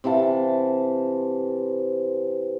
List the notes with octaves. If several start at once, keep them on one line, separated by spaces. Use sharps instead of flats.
C3 E3 F5 A5